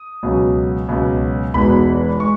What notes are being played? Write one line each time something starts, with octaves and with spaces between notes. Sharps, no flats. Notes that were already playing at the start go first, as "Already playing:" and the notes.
Already playing: D#6
C#2 B2 F#3 C#4
C#2 B2 F#3 C#4
E1 E2 B2 G#3 D#4 B5
G#3 C#6